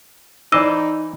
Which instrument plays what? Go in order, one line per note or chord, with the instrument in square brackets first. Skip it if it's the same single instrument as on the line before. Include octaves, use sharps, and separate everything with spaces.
[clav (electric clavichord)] E3 C5 D#5 [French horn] D#4 [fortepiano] D5 D6 [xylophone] E6